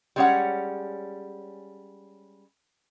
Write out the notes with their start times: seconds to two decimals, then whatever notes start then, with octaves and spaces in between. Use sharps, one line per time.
0.16 G3 G#3 C#4 G#4 C#5 F#5